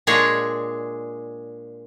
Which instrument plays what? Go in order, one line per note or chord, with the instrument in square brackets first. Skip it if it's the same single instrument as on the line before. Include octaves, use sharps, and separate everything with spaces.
[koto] A#2 G#3 D4 G#4 C#5